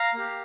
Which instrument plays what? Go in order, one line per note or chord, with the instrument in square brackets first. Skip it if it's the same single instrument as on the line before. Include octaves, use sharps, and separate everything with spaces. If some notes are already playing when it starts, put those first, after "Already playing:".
Already playing: [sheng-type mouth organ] F5 A#5
A#3 G4